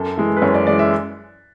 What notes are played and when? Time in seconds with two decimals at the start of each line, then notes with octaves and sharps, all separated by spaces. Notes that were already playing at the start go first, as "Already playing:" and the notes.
Already playing: F#2 A4
0.17 E3 G#3
0.37 B4
0.42 F#2 C#5
0.54 D5
0.67 E3 G#3 D5
0.79 E5